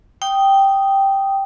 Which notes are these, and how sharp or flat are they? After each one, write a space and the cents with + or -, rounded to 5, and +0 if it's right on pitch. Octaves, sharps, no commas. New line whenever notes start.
G5 +0 D#6 +0